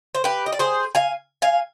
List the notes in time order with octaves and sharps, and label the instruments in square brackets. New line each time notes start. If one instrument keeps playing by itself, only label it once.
[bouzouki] C5
G4 B4
D#5
D5
G#4 C5
F5 G#5
F5 G#5